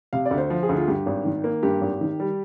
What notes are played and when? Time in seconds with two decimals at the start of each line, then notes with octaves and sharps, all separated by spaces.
0.13 C3 F5
0.26 D5
0.31 D2
0.38 C5
0.50 F3
0.63 G#4
0.69 D2
0.77 F4
0.87 G2 G4
1.06 G#1
1.25 D#3
1.44 A#3
1.63 G2 G4
1.81 G#1
2.01 D#3
2.20 G3